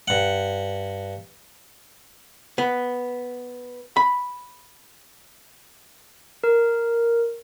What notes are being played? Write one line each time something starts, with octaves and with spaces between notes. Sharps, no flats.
G2 F#5
B3
B5
A#4